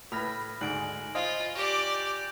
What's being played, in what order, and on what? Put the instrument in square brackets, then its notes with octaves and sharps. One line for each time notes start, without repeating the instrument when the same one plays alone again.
[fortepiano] A2 B4 [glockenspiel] B5 F6 A#6
[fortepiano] D2 G#2 [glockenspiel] G#5 D7 F#7
[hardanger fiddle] F4 [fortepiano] C5 D#5 F5
[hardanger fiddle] G4 D5 [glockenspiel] C#6 A#6
[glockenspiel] G6 F7